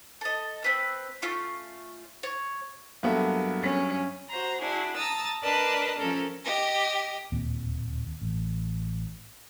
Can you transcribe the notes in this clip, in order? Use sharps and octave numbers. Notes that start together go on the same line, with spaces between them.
A4 D#5
C4 B4 E6
A3 C#4 F4 C#6
C#5
G2 F#3 A#3 B3 A4 E5
C#4
F#4 C5 A#5
D4 E4 F#4 G#4
A5 A#5 D#6 E6 A6
D4 A#4 B4 D5 D#5 A5
F3 C#4 A4 A#4
G4 D#5
D1 D#2 A#2 C4
A1